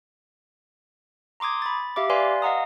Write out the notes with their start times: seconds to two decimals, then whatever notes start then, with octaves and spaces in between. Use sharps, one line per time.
1.40 A#5 C6 D6 D#6 G#6
1.62 B5 A6
1.96 G4 E5 F5 D6
2.10 B4 D5 F5 G#5 C6
2.42 D#5 F5 F#5 A#5 D#6